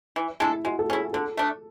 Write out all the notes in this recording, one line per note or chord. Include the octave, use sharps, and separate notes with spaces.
E3
G#3 D4 E4 A4
G#3 F#4
A4
C#4 E4 G#4
D3 A4
A3 D4